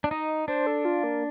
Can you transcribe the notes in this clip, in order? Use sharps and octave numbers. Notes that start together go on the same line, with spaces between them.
D4
D#4 D#5
D4 C5
A4
F4
A#3